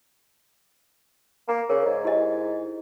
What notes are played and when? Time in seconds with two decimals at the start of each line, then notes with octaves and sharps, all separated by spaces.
1.49 A#3 A#5
1.70 C#3 A#4
1.86 G#2 D5
2.05 E4 G4 D#5